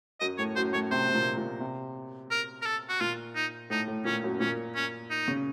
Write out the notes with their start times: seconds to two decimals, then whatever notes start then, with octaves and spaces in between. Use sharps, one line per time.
0.20 F#2 D#5
0.38 A2 C#5
0.56 F#2 C5
0.73 A2 C#5
0.91 C3 C5
1.08 C3
1.15 A#2
1.37 A#2
1.60 C3
2.31 A#4
2.62 A#4
2.66 A4
2.89 F#4
3.01 A#2 F4
3.35 D#4
3.70 A2 D#4
3.88 A2
4.05 A#2 C#4
4.24 F#2
4.40 A#2 C#4
4.75 C#4
5.11 D#4
5.28 C#3